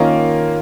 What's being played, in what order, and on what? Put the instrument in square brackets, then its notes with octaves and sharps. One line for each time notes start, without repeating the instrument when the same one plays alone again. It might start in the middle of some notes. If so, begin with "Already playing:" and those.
Already playing: [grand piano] D#3 C#4 F4 A#4 D#5 [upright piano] A#3